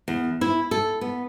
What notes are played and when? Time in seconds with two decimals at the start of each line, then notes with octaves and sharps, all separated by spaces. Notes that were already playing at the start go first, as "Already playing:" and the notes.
0.08 E2
0.41 E4
0.71 A4
1.01 B3